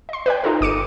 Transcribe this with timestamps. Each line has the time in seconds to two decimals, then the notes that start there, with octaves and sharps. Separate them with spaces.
0.09 D#5 C6
0.26 B4 D5 G5
0.44 D#4 F4 A4 A#4
0.61 G1 D6 C#7 D#7